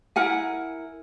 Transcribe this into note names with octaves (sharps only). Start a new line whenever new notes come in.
E4 A#4 F#5 G#5